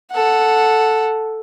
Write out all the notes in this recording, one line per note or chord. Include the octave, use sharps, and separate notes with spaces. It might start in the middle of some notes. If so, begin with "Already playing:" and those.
A4 F#5